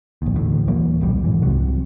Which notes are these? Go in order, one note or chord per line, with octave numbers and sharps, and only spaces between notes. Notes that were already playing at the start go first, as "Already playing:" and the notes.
A#1 D#2
A1 D2 A2
D#1 E3 F#3 A#3
D#1 B1 F2 G3
G#2 E3
C2 C3 F#3